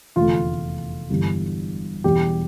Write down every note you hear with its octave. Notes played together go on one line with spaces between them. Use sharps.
F1 E2 D3 A3 F4
G1 G2 E3 G3
E2 B2 G3 G4